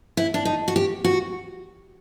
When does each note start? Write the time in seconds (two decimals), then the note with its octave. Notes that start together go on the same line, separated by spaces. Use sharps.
0.17 E4
0.34 D4
0.45 D#4
0.68 F#4
0.76 G4
1.04 F#4